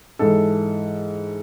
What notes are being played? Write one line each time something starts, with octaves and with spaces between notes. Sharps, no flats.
G#2 E3 A4